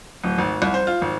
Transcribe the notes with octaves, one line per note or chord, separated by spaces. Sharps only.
D1
G#1
C2
C5
F4
G#1